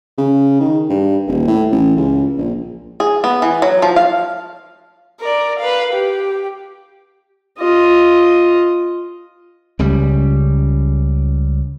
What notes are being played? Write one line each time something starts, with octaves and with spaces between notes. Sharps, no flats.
C#3
D#3
G2
D#1
A2
A1
C#2
A#1
G#4
B3
E3
F#3
F3
F5
A#4 D5
B4 F5
G4
F4 D#5
C#2 C#3 G3